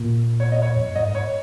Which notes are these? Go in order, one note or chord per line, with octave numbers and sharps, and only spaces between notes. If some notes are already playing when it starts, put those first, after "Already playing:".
Already playing: A#2
C#5
D#5
C#5
F2
F#2
G#2 D#5
C#5